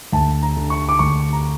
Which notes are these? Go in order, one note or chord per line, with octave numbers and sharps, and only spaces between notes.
D2 A5
A#5
D3
C#6
D6
D2 C#6
A#5